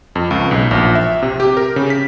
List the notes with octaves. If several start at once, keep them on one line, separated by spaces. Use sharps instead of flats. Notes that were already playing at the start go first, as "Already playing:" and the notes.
F2
C#2
B1
A#1
E5
C3
G4
A#4
C#3
B6